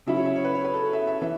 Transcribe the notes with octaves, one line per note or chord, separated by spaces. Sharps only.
C#3 F#3 C#4 E4 E5
C#5
E5
C#5
B4
C#5
B4
A4
E5
E5
E3 E5